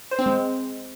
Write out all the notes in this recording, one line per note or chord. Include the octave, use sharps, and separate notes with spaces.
C5
C4
G#3